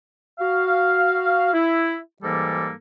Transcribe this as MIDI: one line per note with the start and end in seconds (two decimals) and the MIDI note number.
0.39 1.51 66
0.39 1.51 77
1.53 1.96 64
2.23 2.71 44
2.23 2.71 52
2.23 2.71 55
2.23 2.71 58
2.23 2.71 69